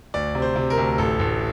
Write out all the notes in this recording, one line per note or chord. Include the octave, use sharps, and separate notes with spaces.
D2 D5
C3
C5
C3
A#4
D2
A1 A4
A1